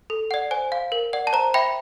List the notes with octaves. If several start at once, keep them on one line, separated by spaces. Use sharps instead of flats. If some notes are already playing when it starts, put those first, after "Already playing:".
A4
D5 F#5
C5 G#5
F5
A#4
D5 F#5
A5
C5 A#5
E5 G5 B5